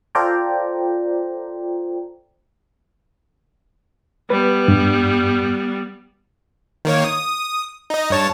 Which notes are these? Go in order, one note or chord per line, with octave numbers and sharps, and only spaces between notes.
F4 A4 C5 D5 G5 A#5
G3 B3 B4
G2
D#3 A#3 C#5
D#6
D#4 D#5
G2 C#5 A5